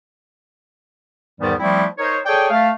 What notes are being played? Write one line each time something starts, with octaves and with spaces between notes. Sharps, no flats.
E2 G#2 D#3 E3 G3 B3
F3 G3 A3 C4 E4
D#4 A#4 C5 C#5
G#4 A4 C#5 D5 G5
A3 F5